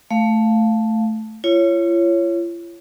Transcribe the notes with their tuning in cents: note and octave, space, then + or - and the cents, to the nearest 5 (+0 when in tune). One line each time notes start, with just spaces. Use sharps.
A3 +0 F5 +0
F4 -45 C#5 +0